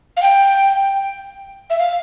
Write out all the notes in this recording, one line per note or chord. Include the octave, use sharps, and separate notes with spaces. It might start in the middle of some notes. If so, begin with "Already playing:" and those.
F5
G5
E5
F5